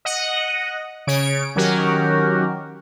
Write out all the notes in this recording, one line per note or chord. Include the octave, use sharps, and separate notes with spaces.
D#5 F#5
C#3 C#5 D7
D#3 F#3 C#4 F#4 G4 A#4